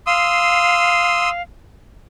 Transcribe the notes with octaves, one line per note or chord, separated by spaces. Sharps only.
F5 C6 D#6 E6